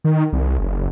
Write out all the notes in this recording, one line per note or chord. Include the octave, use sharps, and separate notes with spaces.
D#3
C2
F#1